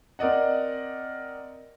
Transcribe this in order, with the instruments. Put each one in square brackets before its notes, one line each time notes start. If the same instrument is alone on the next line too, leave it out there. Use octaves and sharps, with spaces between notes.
[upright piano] C4 A#4 D5 D#5 F#5